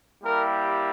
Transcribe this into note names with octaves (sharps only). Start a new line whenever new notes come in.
G3 A#3 E4 G4 A#4